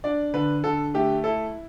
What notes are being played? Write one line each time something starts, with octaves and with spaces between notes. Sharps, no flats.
D4 D5
D3 B4
D3 A4
A3 G4
E4 A4